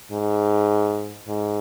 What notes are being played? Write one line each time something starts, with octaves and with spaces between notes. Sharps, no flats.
G#2
G#2